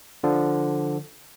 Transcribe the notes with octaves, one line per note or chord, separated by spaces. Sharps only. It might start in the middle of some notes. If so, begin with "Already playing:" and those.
D3 F3